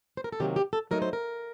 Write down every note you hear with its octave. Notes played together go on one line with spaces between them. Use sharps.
C5
A#4
A4
C3 D#3 F#3 A#3 G4
G4
A4
F#3 A3 D#4 A#4
C5
A#4